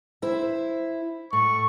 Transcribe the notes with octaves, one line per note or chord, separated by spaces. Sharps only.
E4 C5 E5
A2 C#6